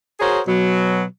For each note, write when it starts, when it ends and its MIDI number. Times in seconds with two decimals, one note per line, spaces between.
0.20 0.40 66
0.20 0.40 68
0.20 0.40 70
0.20 0.40 72
0.20 0.40 73
0.47 1.03 47
0.47 1.03 54